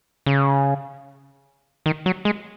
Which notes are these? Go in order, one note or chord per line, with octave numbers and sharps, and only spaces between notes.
C#3
D#3
F#3
G#3